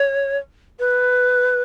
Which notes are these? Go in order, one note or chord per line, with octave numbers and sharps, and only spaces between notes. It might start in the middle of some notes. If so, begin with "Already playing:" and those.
Already playing: C#5
B4